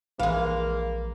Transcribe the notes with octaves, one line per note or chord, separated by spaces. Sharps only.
A#1 E3 G#3 A#3 F5